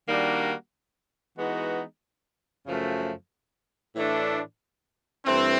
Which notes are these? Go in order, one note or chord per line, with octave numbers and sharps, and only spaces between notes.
D#3 G3 A#3 D4 F#4
E3 G#3 B3 D#4 F#4
F#2 C#3 F3 A3
A2 E3 A3 D4
G2 E3 A3 C4